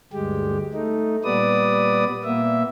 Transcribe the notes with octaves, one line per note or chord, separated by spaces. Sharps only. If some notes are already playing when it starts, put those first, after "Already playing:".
D2 G2 G#3 G4
A3 D#4
A#2 G3 B3 B4 D5 D#6
A#2 A#3 B3 E5